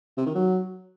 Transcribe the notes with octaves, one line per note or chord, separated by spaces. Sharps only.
C3
D#3
F#3